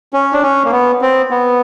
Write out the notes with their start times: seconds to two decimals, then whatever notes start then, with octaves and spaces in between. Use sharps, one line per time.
0.13 C#4
0.32 D4
0.42 C#4
0.65 A#3
0.71 B3
1.01 C4
1.30 B3